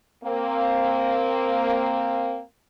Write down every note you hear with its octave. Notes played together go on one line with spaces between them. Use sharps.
A#3 C4